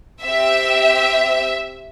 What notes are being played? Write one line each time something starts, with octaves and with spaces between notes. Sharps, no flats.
C4 G4 E5